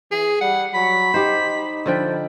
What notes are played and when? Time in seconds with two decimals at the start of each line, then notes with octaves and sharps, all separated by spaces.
0.11 E3 G#4
0.41 G3 F#5
0.74 F#3 B5
1.14 D#4 G4 C5
1.86 D3 F3 G5